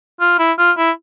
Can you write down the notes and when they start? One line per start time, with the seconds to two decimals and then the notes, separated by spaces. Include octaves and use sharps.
0.20 F4
0.39 E4
0.58 F4
0.77 E4